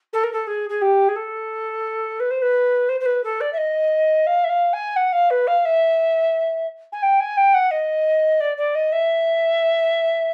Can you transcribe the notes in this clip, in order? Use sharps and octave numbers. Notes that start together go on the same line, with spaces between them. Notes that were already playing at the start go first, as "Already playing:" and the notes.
A4
A#4
A4
G#4
G#4
G4
G#4
A4
B4
C5
B4
C5
C5
B4
A4
D5
E5
D#5
F5
E5
F5
G#5
F#5
F5
B4
F5
E5
G#5
G5
G#5
G5
F#5
D#5
D5
D5
D#5
E5